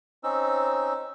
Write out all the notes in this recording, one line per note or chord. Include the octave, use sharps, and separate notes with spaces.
C4 C#4 D#4 E6